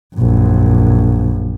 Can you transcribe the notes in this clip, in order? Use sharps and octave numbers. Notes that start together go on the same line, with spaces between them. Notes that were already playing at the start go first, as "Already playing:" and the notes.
A#1 F#2